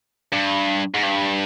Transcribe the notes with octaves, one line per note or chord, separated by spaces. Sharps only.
G2
G#2
G2